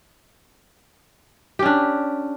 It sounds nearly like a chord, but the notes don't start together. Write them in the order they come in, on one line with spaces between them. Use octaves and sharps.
G4 C#4 D4